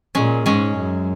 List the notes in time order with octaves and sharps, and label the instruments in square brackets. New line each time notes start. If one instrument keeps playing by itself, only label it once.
[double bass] A#2 [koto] G#3 C#4
[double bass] G#2 [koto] G#3 C#4
[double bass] F#2